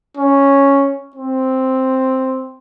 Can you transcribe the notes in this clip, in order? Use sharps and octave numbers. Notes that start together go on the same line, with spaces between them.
C#4
C4